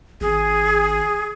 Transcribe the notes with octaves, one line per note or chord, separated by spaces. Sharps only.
G#1 G#4